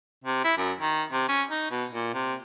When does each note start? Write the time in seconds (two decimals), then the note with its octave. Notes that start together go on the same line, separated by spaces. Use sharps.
0.24 C3
0.44 E4
0.57 F#2
0.81 D#3
1.12 C3
1.29 C#4
1.50 D#4
1.71 B2
1.91 A#2
2.14 C3